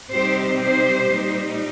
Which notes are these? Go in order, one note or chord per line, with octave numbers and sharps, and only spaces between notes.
C3 G3 C4 D#4 G4 C5
G4 C5
A#2 G3 D#4